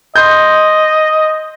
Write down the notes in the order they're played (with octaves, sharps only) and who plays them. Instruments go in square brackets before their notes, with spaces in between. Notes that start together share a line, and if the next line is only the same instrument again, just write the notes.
[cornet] D#5 [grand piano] C6 G6